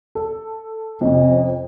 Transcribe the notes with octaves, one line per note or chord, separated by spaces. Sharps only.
A4
F2 C3 C#4 D#5